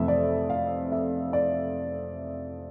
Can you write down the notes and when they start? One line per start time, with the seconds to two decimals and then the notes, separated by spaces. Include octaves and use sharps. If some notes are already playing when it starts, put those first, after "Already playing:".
Already playing: F2 C3 E3 A3 E5
0.08 D5
0.50 F5
0.92 E5
1.33 D5